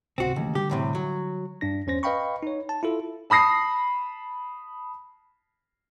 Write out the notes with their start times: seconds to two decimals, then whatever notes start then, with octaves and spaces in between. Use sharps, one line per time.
0.18 G#1 C#2 C3 C4 F#4
0.36 D#2 C#3 E3 A3
0.55 D3 G3 G4
0.70 E2 A2 C3
0.95 F#3
1.61 G2 D4 A#6
1.87 E2 C#4 C5 A#6
2.03 B4 D#5 F5 G5 B5 C#6
2.43 D#4 C#5
2.69 A5
2.83 E4 F4 A4
3.30 A5 B5 D#6 A#6 C7